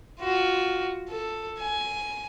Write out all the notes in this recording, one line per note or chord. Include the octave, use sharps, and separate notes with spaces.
F4 F#4
A4
G#5